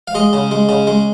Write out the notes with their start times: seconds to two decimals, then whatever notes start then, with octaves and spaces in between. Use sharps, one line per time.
0.08 F5
0.15 G#3 D#5
0.33 C#3
0.51 G#3
0.69 C#3
0.87 G#3